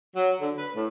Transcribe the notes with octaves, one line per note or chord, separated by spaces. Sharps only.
F#3
D3
B4
A2